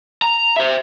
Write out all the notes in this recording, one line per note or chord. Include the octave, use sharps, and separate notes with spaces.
A#5
C5 E5